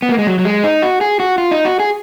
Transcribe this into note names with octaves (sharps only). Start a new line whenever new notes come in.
B3
A#3
G#3
F#3
F#3
G#3
D#4
F#4
G#4
F#4
F4
D#4
F#4
G#4